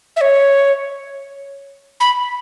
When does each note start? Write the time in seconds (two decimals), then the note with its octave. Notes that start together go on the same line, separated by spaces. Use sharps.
0.16 E5
0.21 C#5
2.00 B5